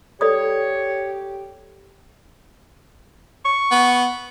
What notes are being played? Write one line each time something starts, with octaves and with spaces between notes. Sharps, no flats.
G4 A4 C#5 D5 D#6
C#6
B3